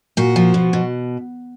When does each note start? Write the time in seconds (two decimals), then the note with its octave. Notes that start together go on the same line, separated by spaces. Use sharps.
0.17 A#2 F#4
0.36 F3
0.54 B2
0.73 B2